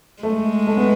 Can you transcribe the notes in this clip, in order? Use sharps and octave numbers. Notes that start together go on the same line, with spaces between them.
G#3 A3
A3
B3